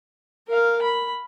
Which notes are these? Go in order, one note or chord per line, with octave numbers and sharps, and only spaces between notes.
A#4 F5
B5